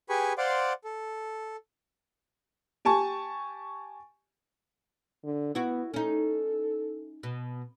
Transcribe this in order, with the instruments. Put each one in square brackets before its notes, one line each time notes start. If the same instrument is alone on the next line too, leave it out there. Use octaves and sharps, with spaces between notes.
[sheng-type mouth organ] G4 G#4 B4 G#5 B5 C#6
C5 D5 F5 F#5 C6 D6
A4
[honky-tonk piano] G4 G#5 A5 C#6
[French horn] D3
[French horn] B3 [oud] E4 F#4
[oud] C#4 D#4 [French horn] A4
[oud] B2